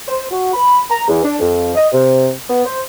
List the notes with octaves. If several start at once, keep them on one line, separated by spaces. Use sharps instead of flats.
C5
F#4
B5
A#5
E2
D4
F2
D#5
C3
B3
C5